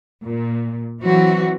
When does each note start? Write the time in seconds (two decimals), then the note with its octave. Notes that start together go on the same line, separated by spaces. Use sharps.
0.24 A#2
1.01 E3 F#3 C4 F#4